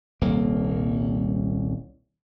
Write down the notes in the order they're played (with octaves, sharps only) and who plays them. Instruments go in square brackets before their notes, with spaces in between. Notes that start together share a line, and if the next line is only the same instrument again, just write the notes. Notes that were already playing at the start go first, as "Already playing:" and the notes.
[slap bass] D#1 C2 A#3